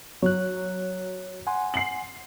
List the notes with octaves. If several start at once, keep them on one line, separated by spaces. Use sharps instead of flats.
F#3 C#5 F#6
F#5 G#5 C6
C7 F#7